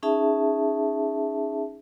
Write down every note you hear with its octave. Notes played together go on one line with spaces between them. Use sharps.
C#4 D#4 G#4 E5 A5